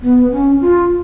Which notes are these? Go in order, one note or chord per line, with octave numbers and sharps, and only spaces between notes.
B3
C#4
F4